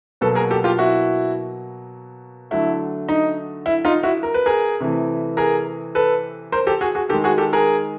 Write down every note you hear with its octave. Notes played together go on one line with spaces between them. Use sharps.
B2 F#3 A#3 A4 B4
G#4 A#4
G4 A4
F4 G4
E4 F#4
D3 F#3 A3 E4
D#4
E4
D#4 F4
E4 F#4
A#4
B4
G#4 A#4
C3 E3 A3
G#4 A#4
A4 B4
A#4 C5
G4 A4
F#4 G#4
F#4 G#4
D#3 G#3 G4 A4
F#4 G#4
G4 A4
G#4 A#4